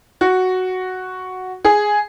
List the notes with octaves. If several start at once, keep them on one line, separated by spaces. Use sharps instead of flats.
F#4
G#4